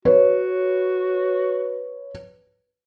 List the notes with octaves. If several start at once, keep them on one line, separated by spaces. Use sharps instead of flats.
F#4 B4 C#5